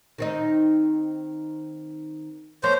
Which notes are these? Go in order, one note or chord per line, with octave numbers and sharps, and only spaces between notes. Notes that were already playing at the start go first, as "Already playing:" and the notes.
D#3 C4 D#4
F3 A#3 C5 C#5